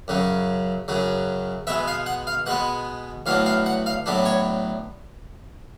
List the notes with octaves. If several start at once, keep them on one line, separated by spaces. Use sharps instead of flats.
F#2 C#3 F#3
F#2 C#3 F#3
B2 G#3 B3 E5
F5
F#5
F5
B2 G#3 B3 F#5
A2 F#3 B3 D4 F5
F5
F#5
F5
A2 F#3 B3 D4
C#5